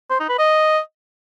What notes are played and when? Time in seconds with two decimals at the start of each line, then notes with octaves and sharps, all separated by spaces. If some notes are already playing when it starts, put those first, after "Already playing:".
0.10 C5
0.20 D#4
0.29 B4
0.39 D#5